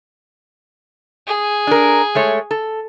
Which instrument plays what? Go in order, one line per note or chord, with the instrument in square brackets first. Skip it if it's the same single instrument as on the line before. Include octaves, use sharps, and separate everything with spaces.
[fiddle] G#4
[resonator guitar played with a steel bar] D4 A#4
G#3 A3 C#5
A4